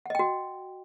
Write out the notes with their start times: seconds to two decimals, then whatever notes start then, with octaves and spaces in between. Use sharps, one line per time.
0.06 F#5
0.10 D#5
0.15 G5
0.19 F#4